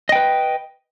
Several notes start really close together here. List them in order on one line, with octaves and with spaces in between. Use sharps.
D#5 G5 B4